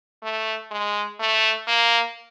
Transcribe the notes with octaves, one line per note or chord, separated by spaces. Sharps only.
A3
G#3
A3
A#3